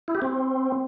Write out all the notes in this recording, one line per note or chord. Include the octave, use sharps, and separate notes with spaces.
E4
G4
C4